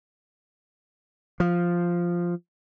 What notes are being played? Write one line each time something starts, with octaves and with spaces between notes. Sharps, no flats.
F3